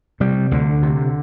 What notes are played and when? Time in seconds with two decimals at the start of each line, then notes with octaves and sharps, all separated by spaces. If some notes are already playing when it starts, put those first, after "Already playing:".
0.20 C3 G3
0.51 D2 D3
0.82 C3